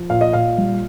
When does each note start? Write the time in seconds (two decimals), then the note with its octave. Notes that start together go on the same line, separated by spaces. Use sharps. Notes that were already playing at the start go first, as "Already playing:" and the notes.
Already playing: F3
0.10 A#2 F5
0.21 D#5
0.33 A#2 F5
0.58 G3